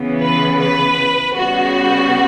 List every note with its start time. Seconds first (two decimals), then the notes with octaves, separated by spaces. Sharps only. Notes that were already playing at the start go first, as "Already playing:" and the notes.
Already playing: C#3 E3 B3
0.21 B4
0.60 B4
1.36 C#3 G3 B3 F#4